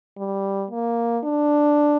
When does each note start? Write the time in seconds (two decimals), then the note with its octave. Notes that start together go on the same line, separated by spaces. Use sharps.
0.17 G3
0.71 A#3
1.24 D4